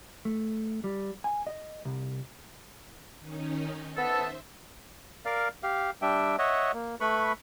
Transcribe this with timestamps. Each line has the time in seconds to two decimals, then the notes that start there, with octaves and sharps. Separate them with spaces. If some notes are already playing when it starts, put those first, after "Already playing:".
0.25 A3
0.84 G3
1.24 G#5
1.47 D#5
1.85 C2
3.19 D#3 C#4 D#4
3.97 B3 A4 C5 E5
5.25 A#4 D5 F5
5.63 G4 F5
6.02 G3 D4 E5 G5
6.39 C#5 D#5 E5 F#5
6.74 A#3
7.00 A3 B4 B5 C#6